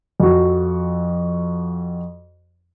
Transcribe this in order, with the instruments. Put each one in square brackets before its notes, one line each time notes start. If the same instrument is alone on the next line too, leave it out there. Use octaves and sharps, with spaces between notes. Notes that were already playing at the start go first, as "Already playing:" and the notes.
[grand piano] F2 F#4